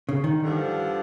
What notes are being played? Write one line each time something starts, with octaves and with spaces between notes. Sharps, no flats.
C#3
D#3
G2 D3 F3